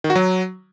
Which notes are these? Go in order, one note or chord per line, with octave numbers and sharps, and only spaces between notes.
D#3
F#4
F#3